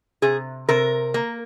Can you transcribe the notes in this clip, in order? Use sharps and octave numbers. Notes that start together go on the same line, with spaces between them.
C3 G#4
C3 A#4
A#3